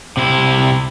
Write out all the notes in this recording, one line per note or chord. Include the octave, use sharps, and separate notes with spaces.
C3 E4